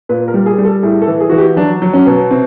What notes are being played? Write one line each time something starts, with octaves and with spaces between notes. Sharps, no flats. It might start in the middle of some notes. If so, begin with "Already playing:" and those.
A#2 B4
A#4
G3
G#4
G3
A4
A2 G#4
A4
E3
G#4
E3 F#4
G4
F#3 D4
F#3
C#4
B2
C3 C4